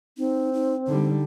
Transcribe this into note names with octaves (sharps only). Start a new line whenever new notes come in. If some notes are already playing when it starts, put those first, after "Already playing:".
C4 D#4
D#4
D3 G3 D#4